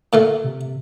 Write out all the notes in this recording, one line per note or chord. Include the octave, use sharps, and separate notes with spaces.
A#2 D3 A3
C3